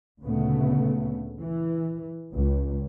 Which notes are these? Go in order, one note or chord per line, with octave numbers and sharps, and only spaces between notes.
D2 A#2 C#3 A3 B3
E3
C#2